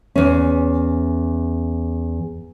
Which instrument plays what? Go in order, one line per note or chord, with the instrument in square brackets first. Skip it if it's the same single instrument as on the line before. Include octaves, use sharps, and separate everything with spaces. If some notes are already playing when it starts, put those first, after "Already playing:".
[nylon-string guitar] E2 C#4